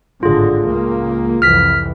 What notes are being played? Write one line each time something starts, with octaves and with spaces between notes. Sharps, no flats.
G#1 A2 D3 F4 G#4
C#2 A#3
C2 F2 E3 F6 B6